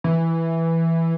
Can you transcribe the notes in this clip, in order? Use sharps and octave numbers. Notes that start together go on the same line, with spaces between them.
E3